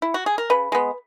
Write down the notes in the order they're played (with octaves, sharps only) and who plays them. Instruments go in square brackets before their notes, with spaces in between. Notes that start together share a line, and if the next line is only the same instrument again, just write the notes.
[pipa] E4
F#4
G#4
A#4
C#3 B4
G#3 B3